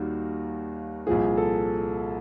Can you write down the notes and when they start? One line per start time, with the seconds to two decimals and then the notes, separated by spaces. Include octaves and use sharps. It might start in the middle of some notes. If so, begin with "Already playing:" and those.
Already playing: D#2 D#3 G3 A#3 F#4
1.07 C2 A#2 F3 G#4
1.37 A4